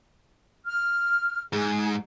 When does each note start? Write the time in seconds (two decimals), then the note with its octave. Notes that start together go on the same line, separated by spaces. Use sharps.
0.67 F6
1.53 G#2 G#4